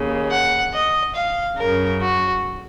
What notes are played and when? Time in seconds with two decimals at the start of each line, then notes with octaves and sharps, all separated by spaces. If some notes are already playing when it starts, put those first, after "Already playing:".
Already playing: D#2 C#3
0.31 F#5
0.73 D#5
1.14 F5
1.57 F#2 C#3 A#4
2.00 F#4